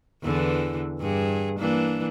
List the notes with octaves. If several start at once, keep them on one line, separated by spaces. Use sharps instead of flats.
E2 D3 E3
G2 G#4
E3 A#3 D4